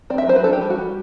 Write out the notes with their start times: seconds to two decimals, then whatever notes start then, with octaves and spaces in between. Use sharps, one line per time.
0.10 C4 D5
0.18 E5
0.27 F#3 C5
0.36 B4
0.44 D4 A4
0.53 G4
0.61 G3
0.70 F#4
0.78 G3